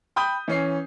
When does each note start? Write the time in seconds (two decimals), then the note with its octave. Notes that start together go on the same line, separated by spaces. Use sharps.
0.16 G5 B5 D#6 G6
0.48 E3 C#4 C7